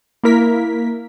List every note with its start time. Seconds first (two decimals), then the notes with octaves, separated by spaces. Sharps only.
0.23 A#3 E4 A#4 B6